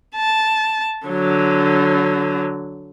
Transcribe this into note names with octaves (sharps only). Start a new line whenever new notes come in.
A5
D3 F#3